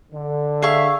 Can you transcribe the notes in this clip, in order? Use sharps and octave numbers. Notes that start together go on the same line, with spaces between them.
D3
G#4 E5 F5 C#6